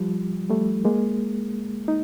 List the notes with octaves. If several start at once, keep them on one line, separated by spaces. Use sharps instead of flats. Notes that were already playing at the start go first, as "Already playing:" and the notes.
Already playing: F3 G3
G3 A3
G#3 A#3
D#4